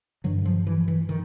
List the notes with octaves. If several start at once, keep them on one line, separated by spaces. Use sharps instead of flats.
G2 D3 F#3
F3
E3
E3
D#3